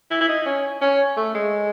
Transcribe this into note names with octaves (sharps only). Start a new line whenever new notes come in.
E4
E4
D#4
C#4
C#4
A3
G#3